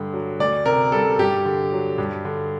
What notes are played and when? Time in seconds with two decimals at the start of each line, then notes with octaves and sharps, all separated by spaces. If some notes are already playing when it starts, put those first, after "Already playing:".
Already playing: G2 D3
0.14 F#3
0.40 D2 D5
0.66 C3 A#4
0.92 G3 A4
1.19 G2 G4
1.46 D3
1.72 F#3
1.98 G2
2.25 D3